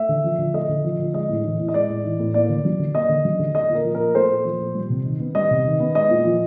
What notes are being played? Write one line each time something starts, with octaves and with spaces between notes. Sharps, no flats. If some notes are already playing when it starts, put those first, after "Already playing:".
Already playing: A3 E5
D3
F3
D3
A3 D#5
D3
F3
D3
G#3 D#5
A2
E3
A2
D#5
G#3 D5
A2
E3
A2
A#3 D5
D3
F#3
D3
A#3 D#5
D3
F#3
D3
A3 D#5
A#2
A#4
F3
A#4
A#2
A3 C5
A#2
F3
A#2
G3
C3
D#3
B3
G3 D#5
C3
D#3
B3
G#3 D#5
A#2
F3